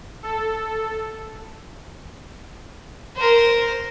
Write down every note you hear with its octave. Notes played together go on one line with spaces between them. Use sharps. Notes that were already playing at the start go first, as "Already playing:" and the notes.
A4
A#4 C5